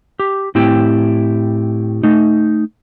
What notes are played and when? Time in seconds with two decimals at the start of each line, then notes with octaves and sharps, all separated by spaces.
0.19 G4
0.55 A2 C4 E4 G4 G5
2.03 A3 D#4